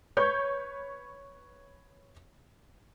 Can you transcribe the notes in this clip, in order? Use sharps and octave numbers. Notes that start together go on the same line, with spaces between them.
B4 C#5 C#6 G6 G#6